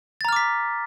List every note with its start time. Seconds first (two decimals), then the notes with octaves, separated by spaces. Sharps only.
0.21 A6
0.25 A#5
0.29 F6
0.32 D6
0.36 B6